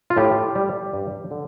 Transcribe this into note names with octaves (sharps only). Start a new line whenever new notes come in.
F4
A2 G4
G3
G2
D3